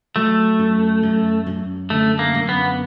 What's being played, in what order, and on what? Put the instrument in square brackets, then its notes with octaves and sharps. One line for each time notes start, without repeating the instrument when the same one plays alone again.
[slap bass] F#3 [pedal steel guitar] A3
[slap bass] F#2
F#2
F#2
[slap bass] D3 [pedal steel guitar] A3
[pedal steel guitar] A#3
[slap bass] F#2
[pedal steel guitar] B3